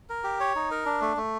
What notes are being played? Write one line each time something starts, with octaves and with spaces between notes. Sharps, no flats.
A#4
G4
C#5
D#4
A#4
D4
A3
A3